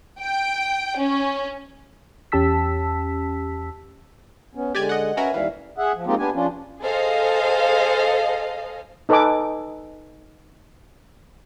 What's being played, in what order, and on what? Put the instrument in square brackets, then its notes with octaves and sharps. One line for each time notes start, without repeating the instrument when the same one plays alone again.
[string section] G5
C#4
[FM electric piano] E2 C#4 G4 A5 E6 B6
[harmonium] B3 C#4
[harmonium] D3 G#3 [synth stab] G4 D5 G#5
[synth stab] D#5 F#5
[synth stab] C#4 F#4 A#4 [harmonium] B4 E5 G#5
[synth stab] D#2 E3 [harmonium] G3 E5 F5
[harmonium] G#4 E5 F#5
F3
G#3 A#3 C4 D#4 F4 G4
B3 D4 G4 G#5
C#3 F3 C#4 D4 F4
[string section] G#4 A4 C5 D#5 F5
[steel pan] D#4 A4 B4 D#5 G#5 D6